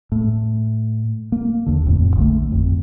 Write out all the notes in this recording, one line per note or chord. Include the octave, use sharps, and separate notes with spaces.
A2
A#3
D#2 D3
D1 F2 A2
A#1 D3 A3
G#1 F2